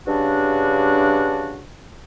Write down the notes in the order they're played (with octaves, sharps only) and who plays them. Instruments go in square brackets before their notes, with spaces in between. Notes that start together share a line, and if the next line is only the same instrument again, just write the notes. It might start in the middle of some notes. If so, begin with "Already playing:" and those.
[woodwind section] G2 C#3 D4 F#4